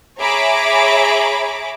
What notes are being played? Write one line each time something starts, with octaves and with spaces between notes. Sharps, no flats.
G#4 C#5 E5 A#5 B5 D6